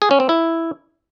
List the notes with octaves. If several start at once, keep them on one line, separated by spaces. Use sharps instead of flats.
G#4
C#4
C4
E4